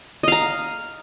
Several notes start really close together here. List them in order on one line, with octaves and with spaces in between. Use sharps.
D#5 F5 A#5